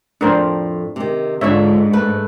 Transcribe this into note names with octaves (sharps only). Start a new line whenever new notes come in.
F2 A2 D4 A#4 C5
C3 D#3
G#2 D3 D4 F4 C#5 E5
A3 A4 B4